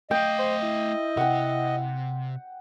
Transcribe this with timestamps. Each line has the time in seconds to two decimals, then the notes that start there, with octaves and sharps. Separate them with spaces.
0.11 A3 D#5 F5 G5
0.39 C5
0.63 E4
1.17 C3 F#5 G5